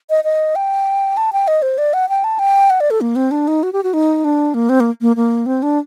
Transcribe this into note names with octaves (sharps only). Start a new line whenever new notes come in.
D#5
D#5
G5
A5
G5
D#5
C5
D5
F#5
G5
A5
G5
F#5
D5
A4
A#3
C4
D4
D#4
F#4
G4
F#4
D#4
D4
A#3
C4
A#3
A#3
A#3
C4
D4